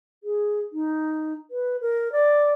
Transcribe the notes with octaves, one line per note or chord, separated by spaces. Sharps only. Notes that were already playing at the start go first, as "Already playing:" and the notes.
G#4
D#4
B4
A#4
D5